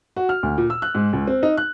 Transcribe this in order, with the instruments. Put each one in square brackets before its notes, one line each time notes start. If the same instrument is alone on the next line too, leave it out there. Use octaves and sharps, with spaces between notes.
[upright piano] F#4
F6
D2
A#2
E6
F#6
G#2
C#2
C4
D#4
F#6